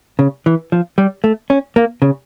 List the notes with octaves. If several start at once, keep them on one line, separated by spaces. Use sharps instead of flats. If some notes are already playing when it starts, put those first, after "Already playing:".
C#3
E3
F3
G3
A3
C#4
A#3
C#3